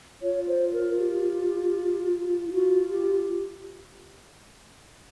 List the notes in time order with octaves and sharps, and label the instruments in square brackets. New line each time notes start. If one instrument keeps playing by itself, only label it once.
[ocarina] F4 [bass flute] C#5
[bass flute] C5
A#4
G4
[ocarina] E4
[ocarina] F4 [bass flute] F#4
[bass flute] G4